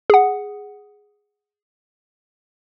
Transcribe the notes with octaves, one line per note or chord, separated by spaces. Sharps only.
G#4 F#5